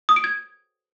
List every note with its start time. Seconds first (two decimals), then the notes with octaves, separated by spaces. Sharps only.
0.09 D#6
0.16 D7
0.24 G#6